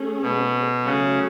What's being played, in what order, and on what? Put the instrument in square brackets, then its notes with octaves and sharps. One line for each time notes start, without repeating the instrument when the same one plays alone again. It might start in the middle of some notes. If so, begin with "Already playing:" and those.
Already playing: [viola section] A3 C#4 G#4
[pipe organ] B2
[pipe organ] C#3 [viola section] F#3 A3 C#4